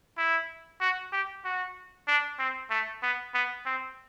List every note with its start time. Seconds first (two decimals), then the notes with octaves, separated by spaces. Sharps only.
0.18 E4
0.81 F#4
1.12 G4
1.45 F#4
2.08 D4
2.39 C4
2.70 A3
3.03 B3
3.34 B3
3.66 C4